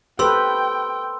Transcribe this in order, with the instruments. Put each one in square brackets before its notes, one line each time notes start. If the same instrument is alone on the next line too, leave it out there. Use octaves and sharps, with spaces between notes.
[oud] G4 [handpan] A4 B4 C5 [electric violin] G5 [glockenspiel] C6 E6